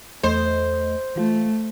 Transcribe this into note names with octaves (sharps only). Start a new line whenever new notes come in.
E2 A3 C5 D#5
E3 A3 F4